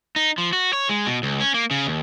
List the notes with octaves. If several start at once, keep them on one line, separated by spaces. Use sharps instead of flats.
D#4
F3
F#4
C#5
G#3
B2
C#2
C#4
A#3
C#3
D#2